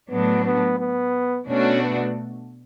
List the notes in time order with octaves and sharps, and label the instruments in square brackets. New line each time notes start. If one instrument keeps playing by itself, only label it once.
[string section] A2 F#3 A3 D4 [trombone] B3
[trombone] B3
B3
[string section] B2 A3 D4 F#4 [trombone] C#4
[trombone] B3